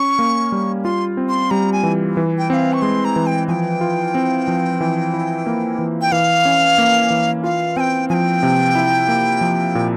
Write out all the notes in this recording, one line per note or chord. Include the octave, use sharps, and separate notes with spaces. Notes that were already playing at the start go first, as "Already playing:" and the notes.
Already playing: C#4 C#6
A#3
G3
F4 C6
C4
C6
G3 A#5
G#5
E3
E3
G5
C4 F5 G5
C#6
G#3 C6
A#5
E3
G5
F3 G5 G#5
F4
C4
F3
E3
E4
A#3
E3
G5
E3 F5
C#4
A#3
E3
F4 F5
C4 G5 G#5
F3 G5 G#5
C3
E4
A#3
F3
A#2